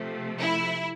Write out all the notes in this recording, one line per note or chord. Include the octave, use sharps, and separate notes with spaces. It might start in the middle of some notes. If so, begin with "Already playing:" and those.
Already playing: C3 F3 A3
E4